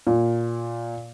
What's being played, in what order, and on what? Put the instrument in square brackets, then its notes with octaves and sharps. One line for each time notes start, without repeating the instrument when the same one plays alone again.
[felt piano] A#2